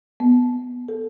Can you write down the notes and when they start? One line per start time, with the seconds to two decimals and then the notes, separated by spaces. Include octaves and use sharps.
0.20 B3
0.88 A4